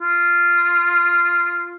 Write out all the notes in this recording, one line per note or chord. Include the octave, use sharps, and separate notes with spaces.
F4